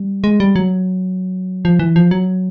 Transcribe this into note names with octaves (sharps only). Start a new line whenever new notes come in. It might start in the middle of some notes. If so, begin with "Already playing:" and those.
Already playing: G3
G#3
G3
F#3
F3
E3
F3
F#3